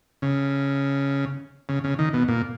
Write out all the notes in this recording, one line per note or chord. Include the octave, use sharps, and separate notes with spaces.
C#3
C#3
C#3
D#3
B2
A#2